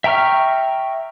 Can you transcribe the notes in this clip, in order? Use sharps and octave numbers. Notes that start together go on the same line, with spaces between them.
E5 G5 A#5 C#6 F6